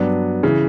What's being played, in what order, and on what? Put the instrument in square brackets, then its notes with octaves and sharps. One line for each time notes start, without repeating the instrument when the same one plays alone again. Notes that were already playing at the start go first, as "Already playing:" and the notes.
Already playing: [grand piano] G2 F#3 B3 D4
C#3 E3